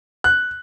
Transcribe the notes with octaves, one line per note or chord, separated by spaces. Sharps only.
F#6